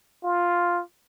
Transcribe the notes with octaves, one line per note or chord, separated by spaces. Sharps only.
F4